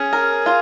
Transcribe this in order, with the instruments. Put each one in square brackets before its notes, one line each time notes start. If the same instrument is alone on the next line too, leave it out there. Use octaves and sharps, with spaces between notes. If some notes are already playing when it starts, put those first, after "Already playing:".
Already playing: [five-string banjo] C#4 [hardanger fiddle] G#4
[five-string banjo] A#4
F4